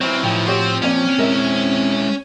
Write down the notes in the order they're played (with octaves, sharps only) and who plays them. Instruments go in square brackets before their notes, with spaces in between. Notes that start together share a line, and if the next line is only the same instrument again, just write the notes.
[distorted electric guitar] E3 F#3 [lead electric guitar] C4 [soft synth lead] F6
[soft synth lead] A2 [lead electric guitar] F3 [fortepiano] G5
[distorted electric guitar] C4 C5 [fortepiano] F#4 G4 C#5
[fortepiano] A#2 D5 [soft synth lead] C4 [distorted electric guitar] C#4
[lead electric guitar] G#3 E4 [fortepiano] A#4 D#5 E5